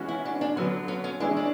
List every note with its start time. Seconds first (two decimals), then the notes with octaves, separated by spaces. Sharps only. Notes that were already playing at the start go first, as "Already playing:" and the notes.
Already playing: E3 G#3 C#4 F#4
0.08 E4
0.25 D4
0.41 D4
0.56 D3 F#3 B3 C#4
0.88 C#4
1.04 C#4
1.20 E3 G#3 C#4 D4 E4 G#4
1.36 D4